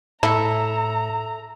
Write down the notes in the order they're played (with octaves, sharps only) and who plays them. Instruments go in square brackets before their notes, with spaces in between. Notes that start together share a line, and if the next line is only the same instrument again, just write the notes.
[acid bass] A2 [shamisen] E4 [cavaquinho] A4 E5 [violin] A#5